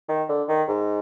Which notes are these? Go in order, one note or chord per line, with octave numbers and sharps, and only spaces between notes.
D#3
D3
D#3
G#2